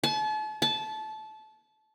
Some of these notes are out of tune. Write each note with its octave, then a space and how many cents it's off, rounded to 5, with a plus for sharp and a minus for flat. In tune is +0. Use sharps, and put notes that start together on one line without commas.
A5 -40
A5 -20